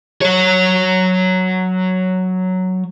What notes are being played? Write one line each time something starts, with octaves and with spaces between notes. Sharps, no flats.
F#3 C#5